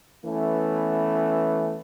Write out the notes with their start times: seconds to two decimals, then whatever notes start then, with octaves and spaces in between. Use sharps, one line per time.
0.25 E3 A3 B3 C#4